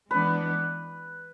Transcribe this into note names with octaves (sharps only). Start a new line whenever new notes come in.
E3 G#3 B3 D4 B4